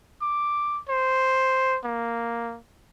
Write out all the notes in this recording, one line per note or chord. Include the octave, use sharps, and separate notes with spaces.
D6
C5
A#3